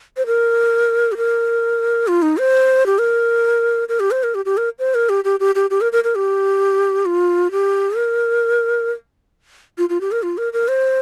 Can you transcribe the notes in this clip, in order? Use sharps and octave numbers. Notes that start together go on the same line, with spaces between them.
C5
A#4
G4
A#4
F4
D#4
C5
G4
A#4
A#4
G4
C5
A#4
G4
G4
A#4
C5
A#4
G4
G4
G4
G4
G4
A#4
A#4
A#4
G4
F4
G4
A#4
F4
F4
G4
A#4
F4
A#4
A#4
C5